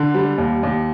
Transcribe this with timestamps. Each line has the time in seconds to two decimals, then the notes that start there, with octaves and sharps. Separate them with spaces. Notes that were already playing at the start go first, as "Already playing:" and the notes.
Already playing: D3
0.14 G3
0.38 D#2
0.63 D#2